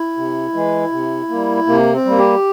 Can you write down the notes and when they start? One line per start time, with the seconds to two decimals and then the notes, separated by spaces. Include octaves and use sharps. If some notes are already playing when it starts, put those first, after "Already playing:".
Already playing: E4
0.17 C3
0.54 E3 G#3
0.92 C3
1.30 G3 A#3
1.67 C3 A#3
1.93 C4
2.05 G3 A#3
2.18 G4